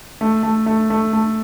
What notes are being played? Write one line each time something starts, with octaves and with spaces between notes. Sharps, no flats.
A3
A3
A3
A3
A3